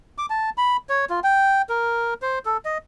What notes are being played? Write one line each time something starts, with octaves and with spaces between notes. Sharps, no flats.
D6
A5
B5
C#5
F4
G5
A#4
C5
A4
D#5